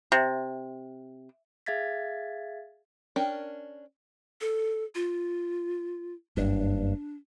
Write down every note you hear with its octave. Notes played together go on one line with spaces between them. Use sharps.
C3
G#4 E5 F5 G#6 A6 B6
C#4 D4 A#4 G5
A4
F4
F#1 G2 D4